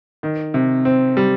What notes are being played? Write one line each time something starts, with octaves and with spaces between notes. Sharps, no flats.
D#3
C3
C4
G3